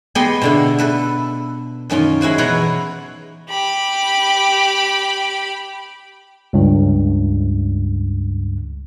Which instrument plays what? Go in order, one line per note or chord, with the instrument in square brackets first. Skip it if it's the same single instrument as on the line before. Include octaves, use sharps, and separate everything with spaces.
[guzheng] G#3 B3 G4 D#5 G5 C6
B2 D3 E4
A4 B4 E5
F#2 D#3 C#4 F4
G#3 E4 F#4 C5
B2 E3 B4 C#5 F#5 A#5
[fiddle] G4 B5
[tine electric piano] C#2 G2